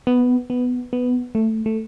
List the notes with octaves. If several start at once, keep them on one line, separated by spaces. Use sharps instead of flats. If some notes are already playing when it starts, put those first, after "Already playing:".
B3
B3
B3
A3
A3